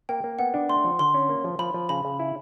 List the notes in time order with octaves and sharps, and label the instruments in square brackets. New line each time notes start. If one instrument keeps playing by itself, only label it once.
[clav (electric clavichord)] A#3 [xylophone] G5
[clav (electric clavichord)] A#3
[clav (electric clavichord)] B3 [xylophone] F#5
[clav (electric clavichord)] D4
[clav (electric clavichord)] A3 [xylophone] C6
[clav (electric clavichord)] F3
[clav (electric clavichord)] D3 [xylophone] C6
[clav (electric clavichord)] C#4
A#3
F3
[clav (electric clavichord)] F3 [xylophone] B5
[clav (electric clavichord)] F3
[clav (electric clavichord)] C#3 [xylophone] B5
[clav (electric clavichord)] C#3
E4